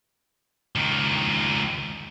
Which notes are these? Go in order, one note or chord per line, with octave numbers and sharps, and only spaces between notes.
C#2 D#3